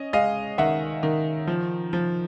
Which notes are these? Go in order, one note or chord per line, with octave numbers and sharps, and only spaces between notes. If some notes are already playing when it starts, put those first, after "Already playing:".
Already playing: C#4 D#5
G#3 D#5 F5
D#3 E5 F#5
D#3
F3
F3